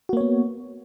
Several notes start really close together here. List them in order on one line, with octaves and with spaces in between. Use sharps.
F#4 A#3 C#5 B3